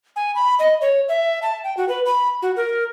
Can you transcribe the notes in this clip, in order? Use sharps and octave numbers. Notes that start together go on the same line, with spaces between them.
G#5
B5
D#5
C#5
E5
A5
G5
F#4
B4
B5
F#4
A#4